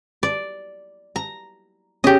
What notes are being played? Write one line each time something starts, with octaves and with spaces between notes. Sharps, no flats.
D5
A#5
C#4 G4 G#4 D#5